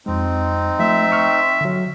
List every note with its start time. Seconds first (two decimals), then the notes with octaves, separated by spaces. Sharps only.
0.06 F2 G#3 C4 D#4
0.79 F3 A3 E5
1.11 G5 C#6 F6
1.61 D3 F#3